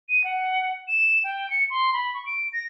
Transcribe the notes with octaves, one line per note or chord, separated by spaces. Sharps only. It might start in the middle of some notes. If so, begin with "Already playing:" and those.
D#7
F#5
E7
G5
C#7
C6
B5
C#6
D7
A#6